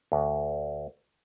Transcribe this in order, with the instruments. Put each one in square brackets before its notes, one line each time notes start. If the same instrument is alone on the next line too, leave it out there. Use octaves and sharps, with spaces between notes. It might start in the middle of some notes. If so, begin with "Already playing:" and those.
[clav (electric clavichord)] D2